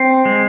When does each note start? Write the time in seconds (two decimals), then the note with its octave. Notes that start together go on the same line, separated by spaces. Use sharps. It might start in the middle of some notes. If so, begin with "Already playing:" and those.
Already playing: C4
0.25 G#3